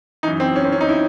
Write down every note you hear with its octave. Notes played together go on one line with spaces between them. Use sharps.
F#2 E3 D#4
C4
C#4
C4
C#4
D#4
E4